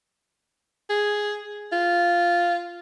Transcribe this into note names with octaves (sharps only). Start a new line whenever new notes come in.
G#4
F4